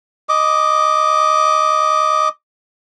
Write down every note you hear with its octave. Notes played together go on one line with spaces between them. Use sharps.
D#5 D6